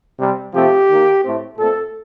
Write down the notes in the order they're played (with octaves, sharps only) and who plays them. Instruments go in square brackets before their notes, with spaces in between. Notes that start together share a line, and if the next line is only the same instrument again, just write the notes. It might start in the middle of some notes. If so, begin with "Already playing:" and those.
[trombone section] C3 G3 C4
C3 F3 A3 C4 G4
D#3 A#3
A2 A3 C4
A#2 A3 C4 A4